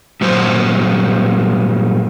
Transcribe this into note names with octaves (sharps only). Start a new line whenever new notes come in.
G2 A#2 F#3 C5